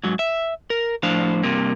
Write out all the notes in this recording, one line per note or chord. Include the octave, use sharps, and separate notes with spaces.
G#2 F#3
E5
A#4
A2 F3 D4 C5 F5
G2 C3 A#3